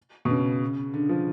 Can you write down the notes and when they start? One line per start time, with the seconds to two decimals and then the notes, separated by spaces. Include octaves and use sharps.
0.25 B2
0.30 C#3
0.94 D3
1.09 F3